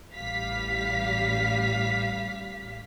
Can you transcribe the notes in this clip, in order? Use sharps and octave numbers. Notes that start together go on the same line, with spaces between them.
A1 G3 F5 B6